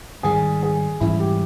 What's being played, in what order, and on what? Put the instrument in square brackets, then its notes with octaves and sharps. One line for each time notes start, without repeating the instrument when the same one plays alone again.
[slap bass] G#2 D#3 G3 [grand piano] G#4
[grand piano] G#4
[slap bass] G#2 E3 G3 C#4 [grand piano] E4
[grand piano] G4